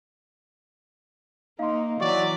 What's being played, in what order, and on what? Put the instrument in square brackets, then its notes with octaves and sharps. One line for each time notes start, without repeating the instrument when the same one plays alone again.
[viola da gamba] A#3 [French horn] D#4 [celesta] F5 C6
[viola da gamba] E3 [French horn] F#3 [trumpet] D5 [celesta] C#6